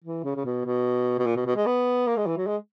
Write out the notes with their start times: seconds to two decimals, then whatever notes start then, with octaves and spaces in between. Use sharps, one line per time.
0.04 E3
0.24 C#3
0.35 C#3
0.45 B2
0.65 B2
1.19 B2
1.26 A#2
1.36 B2
1.46 B2
1.56 G#3
1.66 B3
2.07 A#3
2.17 G#3
2.27 E3
2.37 F#3
2.47 G#3